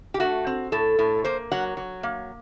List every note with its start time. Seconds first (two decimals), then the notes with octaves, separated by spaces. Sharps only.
0.14 G4
0.20 A3 F#4
0.47 C4
0.72 A2 A4
0.99 A2
1.25 A#3 C5
1.52 F#3 F#5
1.77 F#3
2.03 A#3